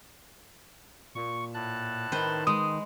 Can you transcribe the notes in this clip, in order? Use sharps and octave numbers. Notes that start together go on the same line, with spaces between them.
A#2 C#6
A2 A5 F#6
D#3 B4 C5
G#3 D#6